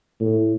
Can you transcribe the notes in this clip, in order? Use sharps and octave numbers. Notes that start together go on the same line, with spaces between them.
A2